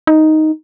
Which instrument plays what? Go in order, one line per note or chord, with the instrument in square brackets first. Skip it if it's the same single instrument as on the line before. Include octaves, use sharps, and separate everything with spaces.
[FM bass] D#4